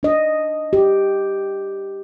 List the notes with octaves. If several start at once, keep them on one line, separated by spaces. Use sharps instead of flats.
D4 D#5
G4